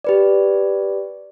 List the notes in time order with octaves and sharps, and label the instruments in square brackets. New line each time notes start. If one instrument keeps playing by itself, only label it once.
[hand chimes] G4 B4 D5